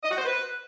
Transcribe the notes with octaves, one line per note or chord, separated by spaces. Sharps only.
D#5
F#4
C5
B4